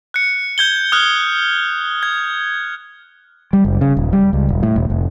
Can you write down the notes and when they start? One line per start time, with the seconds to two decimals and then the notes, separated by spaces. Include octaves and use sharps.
0.14 F#6 C#7
0.58 G6 G#6 G7
0.92 D#6 F6 F#6
2.03 G#6
3.53 G3
3.65 F#1
3.81 C#3
3.97 D#1
4.13 G3
4.33 C#2
4.49 E1
4.63 A2
4.76 E1
4.90 F1